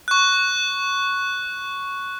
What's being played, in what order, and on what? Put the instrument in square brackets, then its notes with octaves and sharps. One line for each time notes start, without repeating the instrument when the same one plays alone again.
[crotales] C#6 F#6